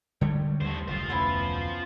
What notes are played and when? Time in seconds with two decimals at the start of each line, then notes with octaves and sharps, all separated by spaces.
0.21 D3 G3 G#3 C#5 G5
0.61 D#2 G3 A3 C5
0.88 F1 D2 F4 C5
1.09 B3 C#4 E4